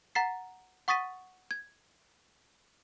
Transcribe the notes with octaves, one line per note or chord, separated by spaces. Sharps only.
F#5 A#5 A6 B6 C7
F#5 C#6 D#6 A6 B6 D#7
G#6